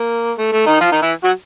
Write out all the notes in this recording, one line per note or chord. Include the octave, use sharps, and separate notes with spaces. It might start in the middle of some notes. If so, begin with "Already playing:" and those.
Already playing: A#3
A3
A3
D#3 D#4
F3 F4
D#3 D#4
E3 E4
F#3 F#4